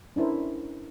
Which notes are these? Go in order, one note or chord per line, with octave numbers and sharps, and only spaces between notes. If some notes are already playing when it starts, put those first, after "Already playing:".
C#4 D4 E4 A#4 C5